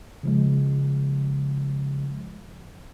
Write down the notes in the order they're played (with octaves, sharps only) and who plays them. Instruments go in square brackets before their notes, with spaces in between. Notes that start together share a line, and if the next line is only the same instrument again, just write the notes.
[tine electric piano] C#3 F3 G#3